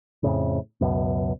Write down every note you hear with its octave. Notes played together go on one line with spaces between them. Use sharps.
F2 A2 C#3
C#2 F#2 B2